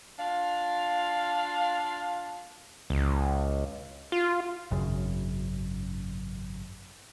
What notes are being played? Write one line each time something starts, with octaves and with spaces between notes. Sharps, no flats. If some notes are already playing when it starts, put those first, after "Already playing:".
D4 F4 F5
C#2
F4
G#1 F#2 C#3